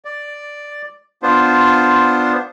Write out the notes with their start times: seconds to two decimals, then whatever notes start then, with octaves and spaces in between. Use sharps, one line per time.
0.05 D5
1.23 B3 D4 F4 C5